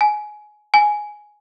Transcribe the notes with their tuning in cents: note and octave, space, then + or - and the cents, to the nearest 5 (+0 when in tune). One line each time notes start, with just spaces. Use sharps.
G#5 +20
G#5 +5